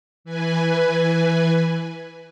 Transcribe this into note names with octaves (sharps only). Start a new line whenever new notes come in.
E3 B4 G#5